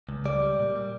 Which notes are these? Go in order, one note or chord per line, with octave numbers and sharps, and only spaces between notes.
C#2
G3 D5
G3
A#2
G3